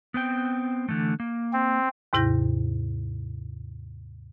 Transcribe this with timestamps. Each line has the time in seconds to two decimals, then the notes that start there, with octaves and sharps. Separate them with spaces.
0.14 B3 C4 G5
0.89 D3 E3 A3
1.20 A#3
1.53 C4
2.13 D#2 G#2 C3 E4 G6 A#6